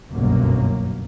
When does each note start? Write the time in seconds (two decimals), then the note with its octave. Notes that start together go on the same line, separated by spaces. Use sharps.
0.12 G1 C2 F#2 B2 F#3 A#3